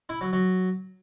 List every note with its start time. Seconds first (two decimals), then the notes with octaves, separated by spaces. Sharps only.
0.09 E4
0.21 F#3
0.33 F#3